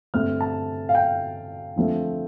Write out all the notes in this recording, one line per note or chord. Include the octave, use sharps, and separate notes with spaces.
G2 D3 A3 C4 F6
A5
F5
G5
D3 F3 A3 C4